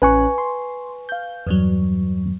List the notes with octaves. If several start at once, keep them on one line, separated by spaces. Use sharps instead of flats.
A1 C#4 B4 G#5 C#6 F#6
C6
F5 G6
E2 G2 F#3